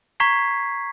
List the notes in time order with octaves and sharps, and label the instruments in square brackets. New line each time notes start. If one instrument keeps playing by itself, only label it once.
[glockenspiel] A#5 C#6 G#6 B6 C7